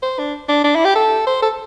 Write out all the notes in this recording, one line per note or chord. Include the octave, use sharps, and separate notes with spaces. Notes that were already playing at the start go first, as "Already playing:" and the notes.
C5
D4
D4
D4
E4
G4
A4
C5
A4